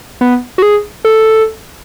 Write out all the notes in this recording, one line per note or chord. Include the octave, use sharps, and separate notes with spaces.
B3
F#4
G#4
A4